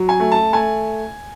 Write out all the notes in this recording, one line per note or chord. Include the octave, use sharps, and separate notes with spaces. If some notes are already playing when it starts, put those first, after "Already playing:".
Already playing: F#3
G#5
A3
A5
A3 G#5